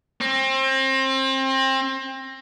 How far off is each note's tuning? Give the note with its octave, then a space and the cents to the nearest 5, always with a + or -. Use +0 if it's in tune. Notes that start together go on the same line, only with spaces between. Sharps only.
C4 +30